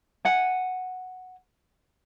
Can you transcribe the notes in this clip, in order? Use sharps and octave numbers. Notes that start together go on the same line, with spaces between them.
F#5 G#5